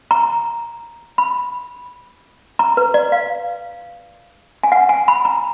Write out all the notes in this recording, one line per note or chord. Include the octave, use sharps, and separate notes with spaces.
A#5
B5
A#5
B4
D5
F5
G#5
F#5
G#5
B5
A#5